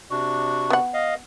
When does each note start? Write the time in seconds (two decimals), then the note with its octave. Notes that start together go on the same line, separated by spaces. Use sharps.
0.11 C3 D4 F#4
0.70 B3 F#5
0.94 D#5 F5